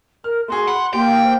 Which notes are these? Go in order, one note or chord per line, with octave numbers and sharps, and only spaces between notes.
A#4 F6
A3 F#4 G#4 C6
F#5 B5
A#3 G4 G5
F5
C5